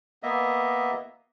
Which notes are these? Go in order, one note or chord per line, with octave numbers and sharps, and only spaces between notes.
A#3 B3 D#5 E5